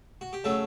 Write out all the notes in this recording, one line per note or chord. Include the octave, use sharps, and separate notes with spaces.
F#4
G4
C#3 F#3 A3 A4